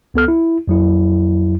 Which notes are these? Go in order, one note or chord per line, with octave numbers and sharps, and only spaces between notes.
C#2 B3 A4 F6
E4
F2 F#3 E4